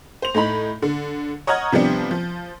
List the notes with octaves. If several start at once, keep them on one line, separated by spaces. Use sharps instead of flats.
C5 F7
A2 D#4 B5
D3
C#5 D#5 F#5 A#5 F6 G#6
C3 F3 G3 B3 D4
F3